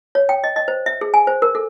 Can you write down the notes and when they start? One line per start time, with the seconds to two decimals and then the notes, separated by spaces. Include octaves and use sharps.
0.15 C#5
0.29 G5
0.44 D#5
0.56 D#5
0.68 C5
0.86 E5
1.01 G#4
1.14 G#5
1.27 C5
1.42 A#4
1.55 A4